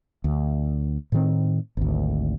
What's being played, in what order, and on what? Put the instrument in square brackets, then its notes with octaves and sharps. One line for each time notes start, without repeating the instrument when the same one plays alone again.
[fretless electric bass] D2
A2 D#3 C4
G#1 D2